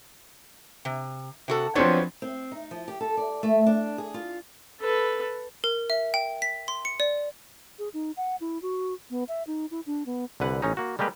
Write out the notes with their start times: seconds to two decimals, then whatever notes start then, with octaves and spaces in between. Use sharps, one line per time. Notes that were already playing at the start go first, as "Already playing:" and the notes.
0.85 C3
1.48 C3 F#4 A4
1.75 F3 F#3 B3 C4 D4 C#5
2.22 C4
2.52 D#4
2.71 F3
2.88 G4
3.01 A4
3.17 D5
3.43 A3
3.66 D4
3.98 G#4
4.14 F4
4.80 A4 B4
5.64 A#4
5.90 E5
6.14 G5
6.42 B6
6.68 C6
6.85 C#7
7.00 D5
7.79 G#4
7.94 D#4
8.17 F#5
8.41 E4
8.62 F#4
9.10 B3
9.29 E5
9.47 D#4
9.71 E4
9.86 D4
10.06 B3
10.40 C2 D3 B4 F#5
10.62 A1 C#4 D#4
10.77 A#3 F#4
10.99 G3 G#3 A#3 G4 B4